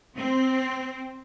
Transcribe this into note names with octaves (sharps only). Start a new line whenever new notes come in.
C4